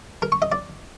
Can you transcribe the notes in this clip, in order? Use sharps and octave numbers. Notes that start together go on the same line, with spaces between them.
A#4
C#6
D#5
D5